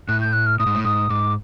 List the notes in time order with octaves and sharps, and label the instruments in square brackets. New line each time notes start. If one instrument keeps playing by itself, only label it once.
[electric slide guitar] A2 [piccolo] F#6
[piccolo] G6
F#6
F6
[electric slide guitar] A2 [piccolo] D#6
[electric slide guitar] G#2
A2
[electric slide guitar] G#2 [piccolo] D#6
[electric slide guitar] G#2 [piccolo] D6